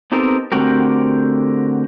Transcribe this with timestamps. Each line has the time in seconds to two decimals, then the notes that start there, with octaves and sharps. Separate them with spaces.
0.12 B3 C4 D#4 G4 A4 A#4
0.52 D3 A3 C4 F#4 G4 A#4